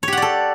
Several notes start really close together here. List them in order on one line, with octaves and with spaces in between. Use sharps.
C#5 G4 F#5 D5 A4